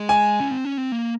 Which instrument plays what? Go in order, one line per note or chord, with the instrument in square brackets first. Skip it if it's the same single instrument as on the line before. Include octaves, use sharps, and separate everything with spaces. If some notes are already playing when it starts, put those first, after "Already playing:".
Already playing: [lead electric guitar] G#3
[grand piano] G#5
[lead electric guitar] C#4
C4
C#4
C4
A#3